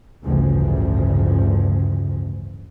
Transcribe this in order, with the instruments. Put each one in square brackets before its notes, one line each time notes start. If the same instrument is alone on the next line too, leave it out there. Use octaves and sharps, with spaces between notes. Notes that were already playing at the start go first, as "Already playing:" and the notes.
[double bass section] A1 D2 G2 C#3 F3